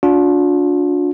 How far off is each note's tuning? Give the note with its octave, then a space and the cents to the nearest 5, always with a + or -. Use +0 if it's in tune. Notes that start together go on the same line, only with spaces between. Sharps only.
D4 -25 F4 +45